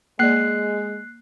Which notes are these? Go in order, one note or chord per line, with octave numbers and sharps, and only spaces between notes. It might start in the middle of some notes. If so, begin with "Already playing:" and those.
G#3 A#3 D5 F#6 C7